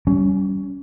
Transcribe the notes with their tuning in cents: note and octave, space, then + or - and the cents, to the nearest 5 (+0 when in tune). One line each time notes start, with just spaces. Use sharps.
G3 -30 C#4 +15